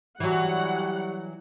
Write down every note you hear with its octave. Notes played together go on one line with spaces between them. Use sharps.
E3 F#3 G3 F#5